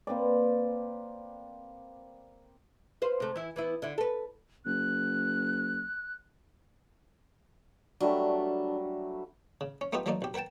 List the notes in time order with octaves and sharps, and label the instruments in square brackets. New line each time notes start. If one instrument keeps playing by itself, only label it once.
[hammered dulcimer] A#3 C4 B4 D5
[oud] B4 C5 F5
C3 A3
E3 E4
E3 B3 E4
D3 E4
A4 B4
[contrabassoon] F#1 [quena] F#6
[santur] F#3 G3 A3 [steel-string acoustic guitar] D4
[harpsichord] C#3
C#4
A3 B3 D#4 F4 G4 B4
E3 F#3 A3 A#3 D#4 D5
B1 G4
A#4 B4 F#5 G5 A5